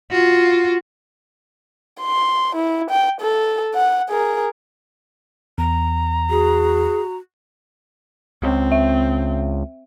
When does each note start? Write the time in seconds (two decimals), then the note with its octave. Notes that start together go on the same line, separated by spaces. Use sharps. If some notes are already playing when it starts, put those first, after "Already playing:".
0.11 F4 F#4
2.01 C6
2.55 E4
2.90 G5
3.21 A4
3.75 F#5
4.09 G#4 A#4
5.58 E2 A#5
6.30 F#4 G#4
8.42 C#2 C4
8.72 E5